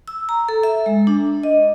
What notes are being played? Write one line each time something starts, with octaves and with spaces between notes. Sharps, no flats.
E6
A#5
A4
E5
G#3
D4
D#5